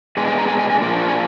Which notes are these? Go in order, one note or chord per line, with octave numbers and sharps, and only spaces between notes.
B2 G#3 D4 G#5
G#5
A#5
G#5
G#5
G#5
A#2 F3 A#3 D4
G#5